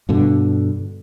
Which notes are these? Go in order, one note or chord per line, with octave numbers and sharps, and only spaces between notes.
G2 B2 D3